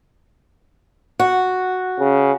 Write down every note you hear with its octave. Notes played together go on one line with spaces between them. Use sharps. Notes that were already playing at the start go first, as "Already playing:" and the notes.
F#4
C#3